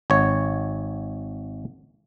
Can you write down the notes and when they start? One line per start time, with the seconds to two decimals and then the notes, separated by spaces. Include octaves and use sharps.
0.10 G#1 C#5